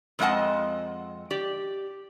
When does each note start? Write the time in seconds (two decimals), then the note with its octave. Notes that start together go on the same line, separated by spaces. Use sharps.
0.19 F2 G#3 C4 D#5 F#5 A5
1.31 G4 D5